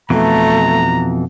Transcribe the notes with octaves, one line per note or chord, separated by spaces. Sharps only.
F2 B2 E3 A3 A#5